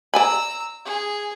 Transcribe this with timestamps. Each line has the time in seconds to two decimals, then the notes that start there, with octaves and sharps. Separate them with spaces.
0.14 D5 G#5 A#5 B5 E6
0.85 G#4